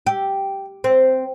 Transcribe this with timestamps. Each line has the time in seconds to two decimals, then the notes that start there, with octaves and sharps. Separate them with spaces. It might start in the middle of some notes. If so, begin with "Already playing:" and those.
0.06 G4
0.84 C4